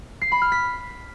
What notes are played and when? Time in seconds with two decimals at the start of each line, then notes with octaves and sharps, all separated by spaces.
0.21 C7
0.32 B5
0.42 F6
0.52 B6